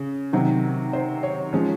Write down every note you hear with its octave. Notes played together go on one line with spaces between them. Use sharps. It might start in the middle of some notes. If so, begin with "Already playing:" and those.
Already playing: C#3
C3 D#3 F#3
C5
C#5
F3 G#3 C#4